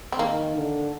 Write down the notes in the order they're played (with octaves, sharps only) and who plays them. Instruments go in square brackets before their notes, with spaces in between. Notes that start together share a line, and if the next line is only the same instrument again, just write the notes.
[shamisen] C4
[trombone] D#3 [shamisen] A#3
[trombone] D3